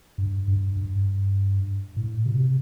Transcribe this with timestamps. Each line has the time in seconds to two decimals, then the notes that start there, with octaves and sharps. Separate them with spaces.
0.18 G2
0.48 G2
0.77 G2
1.97 A2
2.26 C3